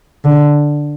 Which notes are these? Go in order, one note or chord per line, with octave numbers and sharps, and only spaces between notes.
D3